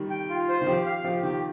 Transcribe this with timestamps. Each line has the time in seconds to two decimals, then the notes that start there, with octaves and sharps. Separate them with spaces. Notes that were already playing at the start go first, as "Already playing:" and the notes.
Already playing: D#3 G3
0.10 G5
0.29 F4
0.49 C5
0.61 D#3
0.67 F3 G4
0.86 F5
1.04 F3 G4
1.23 D#3 G4